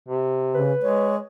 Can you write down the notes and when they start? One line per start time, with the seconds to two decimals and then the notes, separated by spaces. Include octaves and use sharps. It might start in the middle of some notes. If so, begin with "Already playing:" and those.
0.09 C3
0.54 C#3 B4
0.82 G#3 C#5